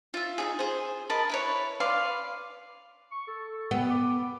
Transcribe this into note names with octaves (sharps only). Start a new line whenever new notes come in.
F4 E5
D#4 F#4 G#4
G#4 C5
A#4 D#5 A5 B5
E4 B4 C#5
B4 D5 F5 C6
C#6
A4
B3
D6